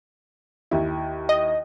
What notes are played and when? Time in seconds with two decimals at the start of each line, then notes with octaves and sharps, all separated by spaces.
0.71 D#2 E4
1.29 D#5